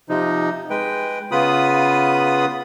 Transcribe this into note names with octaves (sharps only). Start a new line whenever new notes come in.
C3 F3 D#4
G#3 B4 G5
C#3 B3 F4 B4 B5 D#6